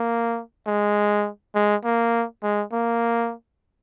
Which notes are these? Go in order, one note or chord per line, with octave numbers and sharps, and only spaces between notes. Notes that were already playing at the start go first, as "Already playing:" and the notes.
Already playing: A#3
G#3
G#3
A#3
G#3
A#3